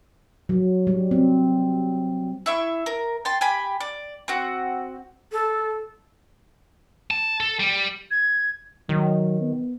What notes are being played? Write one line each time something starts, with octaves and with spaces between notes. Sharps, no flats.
F#3
G3
C4
E4 E5 C#6
A#4
G5 A5 C6
G4 G#5 B5
D5
C4 F#4
A4
A5
A4
G3
G#6
D#3 F#3
B3